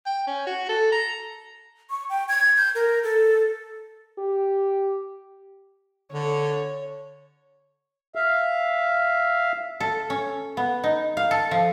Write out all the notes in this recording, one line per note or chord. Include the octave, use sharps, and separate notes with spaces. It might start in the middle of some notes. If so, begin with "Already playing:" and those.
G5
C#4
F#4
A4
A#5
C#6
G5
G#6
G6
A#4
A4
G4
D3 C#5
E5 F5
A4
C#4
B3
D#4
F5
A4
F3